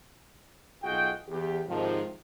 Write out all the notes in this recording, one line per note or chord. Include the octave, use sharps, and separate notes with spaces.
B1 F4 F#4 G#4 D#5 G5
E2 G4
G#2 C3 D#3 F3